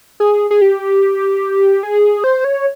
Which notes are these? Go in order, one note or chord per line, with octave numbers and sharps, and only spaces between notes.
G#4
G#4
G4
G#4
C5
C#5